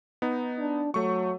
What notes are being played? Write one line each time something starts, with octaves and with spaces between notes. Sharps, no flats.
B3 D#4
D4
F#3 A3 C#6